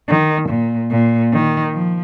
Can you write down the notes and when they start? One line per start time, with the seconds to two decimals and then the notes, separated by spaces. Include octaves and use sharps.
0.08 D#3
0.49 A#2
0.91 A#2
1.32 D#3
1.73 F3